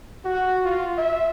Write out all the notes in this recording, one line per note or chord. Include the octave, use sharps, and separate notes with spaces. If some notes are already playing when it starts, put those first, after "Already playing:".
F#4
F4
E5